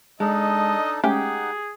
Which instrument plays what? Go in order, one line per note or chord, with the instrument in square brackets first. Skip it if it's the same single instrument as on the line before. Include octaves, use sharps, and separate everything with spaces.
[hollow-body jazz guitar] G#3 [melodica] D4 D#4 A4 [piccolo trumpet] D#5
[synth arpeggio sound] G#3 A3 C#4 [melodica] D#4 F#5 [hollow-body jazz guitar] G4 [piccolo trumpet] G#4